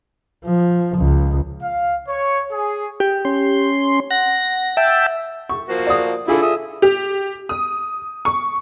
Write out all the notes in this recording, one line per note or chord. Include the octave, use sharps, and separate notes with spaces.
F3
C#2
F5
C#5
G#4
G4
C#4 C6
F#5 A#6
E5 G5 A5
C#6
F3 A#3 F#4
D5 D#6
D3 E4 F4 G#4 A4
E5 D#6
G4
D#6
C#6